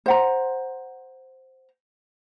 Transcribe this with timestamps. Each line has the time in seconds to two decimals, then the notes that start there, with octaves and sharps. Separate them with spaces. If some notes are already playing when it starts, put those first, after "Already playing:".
0.06 C5 F#5 A#5